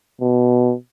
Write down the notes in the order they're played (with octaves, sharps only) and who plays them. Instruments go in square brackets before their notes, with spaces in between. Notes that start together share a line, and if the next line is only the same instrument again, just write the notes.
[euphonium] B2